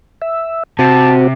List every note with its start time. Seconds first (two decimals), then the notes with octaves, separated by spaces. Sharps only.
0.22 E5
0.79 C3 C4 F#4 A5